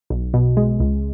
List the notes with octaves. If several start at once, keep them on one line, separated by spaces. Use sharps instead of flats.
B1
B2
G#3
C#2